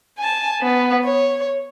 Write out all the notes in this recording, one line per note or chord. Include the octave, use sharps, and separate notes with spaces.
G#5 A5
B3
C#5